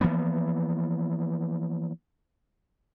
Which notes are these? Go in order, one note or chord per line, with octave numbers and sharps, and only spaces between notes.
E3 F3 A#3 B3